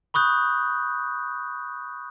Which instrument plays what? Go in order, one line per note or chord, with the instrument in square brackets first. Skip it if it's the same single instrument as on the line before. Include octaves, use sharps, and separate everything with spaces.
[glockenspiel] B5 C#6 D#6 F#6 G6